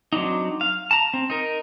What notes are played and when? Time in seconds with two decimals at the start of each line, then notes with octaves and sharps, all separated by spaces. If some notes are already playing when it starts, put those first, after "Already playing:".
0.13 F#3 C4 D4 D#4
0.61 F5
0.91 A5 A#5
1.14 C4
1.30 D#4 A#4